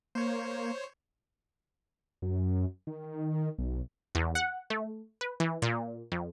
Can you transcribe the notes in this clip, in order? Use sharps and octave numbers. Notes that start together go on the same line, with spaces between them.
A#3 C5 C#5
F#2
D#3
B1
E2
F#5
A3
B4
E3
A#2
F2